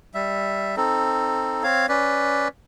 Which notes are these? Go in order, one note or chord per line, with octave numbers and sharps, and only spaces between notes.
G3 E5
C4 D#4 A4
C4 C#5 F5
C#4 B4 D5